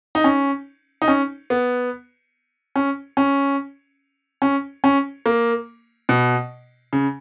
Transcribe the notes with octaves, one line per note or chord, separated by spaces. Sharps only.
D#4
C#4
D#4
C#4
B3
C#4
C#4
C#4
C#4
A#3
B2
C#3